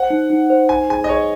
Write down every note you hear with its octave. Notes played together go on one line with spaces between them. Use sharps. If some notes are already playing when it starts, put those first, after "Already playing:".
Already playing: C5 F#5
D#4
D#4
C5
C5 G#5
G#4 G#5
D#5
G#4 C#5